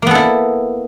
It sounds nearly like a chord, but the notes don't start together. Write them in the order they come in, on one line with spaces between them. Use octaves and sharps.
A#3 B3 A4 E4